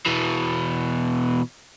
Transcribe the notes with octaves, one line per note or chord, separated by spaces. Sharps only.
B2 E3